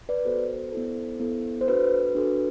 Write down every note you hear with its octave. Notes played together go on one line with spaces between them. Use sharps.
B4 D5
B3 F#4 A4 C5
B3 E4 A4
B3 E4 A4
C5
D4 F#4 A4 B4
D4 F#4 A4